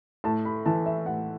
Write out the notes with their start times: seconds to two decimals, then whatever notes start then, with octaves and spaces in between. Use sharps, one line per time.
0.24 A2 A5
0.45 B5
0.66 E3 A5
0.86 E5
1.06 A2 F#5